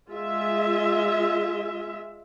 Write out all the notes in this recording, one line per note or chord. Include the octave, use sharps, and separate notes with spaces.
G#3 F4 E5